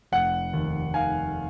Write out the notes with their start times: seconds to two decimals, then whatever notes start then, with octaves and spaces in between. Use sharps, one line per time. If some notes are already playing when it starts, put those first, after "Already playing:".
0.12 F1 F#5
0.53 D#2
0.94 D#3 F5 G#5